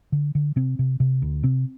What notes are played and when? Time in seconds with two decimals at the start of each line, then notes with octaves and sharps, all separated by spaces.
0.12 D3
0.35 D3
0.56 C3 C4
0.79 C3
1.00 C3
1.22 D2
1.43 C3 C4